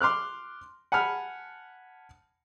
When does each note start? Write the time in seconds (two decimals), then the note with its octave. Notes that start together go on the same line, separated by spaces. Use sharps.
0.01 C6 D6 F6 F#6
0.92 F#5 G#5 A5 B5 F6